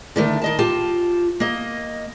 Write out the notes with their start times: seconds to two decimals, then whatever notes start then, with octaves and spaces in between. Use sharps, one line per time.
0.16 D3 D#3 A3
0.41 D#3 D#5 A5
0.59 F4 G4 A5
1.40 A#3 D#5